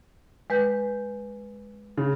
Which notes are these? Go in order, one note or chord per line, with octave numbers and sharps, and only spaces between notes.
G#3 B4 G6
C#3